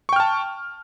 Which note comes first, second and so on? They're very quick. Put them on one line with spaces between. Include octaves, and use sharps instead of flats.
C#6 G5 F6 A5